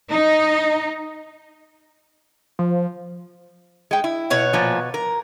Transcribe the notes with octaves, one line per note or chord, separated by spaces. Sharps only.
D#4
F3
G#3 G5
E4
B2 C#5 F#5
A#2 F3
A#4